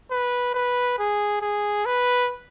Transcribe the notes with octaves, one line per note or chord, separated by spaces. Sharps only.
B4
B4
G#4
G#4
B4